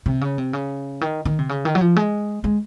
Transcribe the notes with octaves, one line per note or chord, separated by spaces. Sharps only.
C3
C#3
C3
C#3
D#3
D#3
C3
C#3
D#3
F#3
F3
G#3
G#3